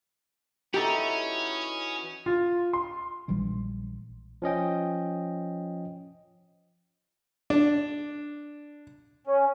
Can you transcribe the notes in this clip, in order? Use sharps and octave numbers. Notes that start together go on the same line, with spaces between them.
E3 C#4 D#4 F#4 G4 A4
F4
C6
A#1 E3 G3 G#3
F3 C#4 D#5 G5
D4
C#4